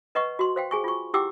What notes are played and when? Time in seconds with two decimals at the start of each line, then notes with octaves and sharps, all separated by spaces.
0.15 B4 D#5 F#5 C#6
0.39 F#4 C6
0.56 C5 F5 G5
0.71 G#4 G#5 C#6
0.84 F4 C#6
1.14 E4 G4 F#5 G5 D6 E6